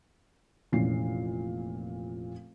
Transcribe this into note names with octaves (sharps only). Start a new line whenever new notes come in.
F1 A#2 E3 C#4 C7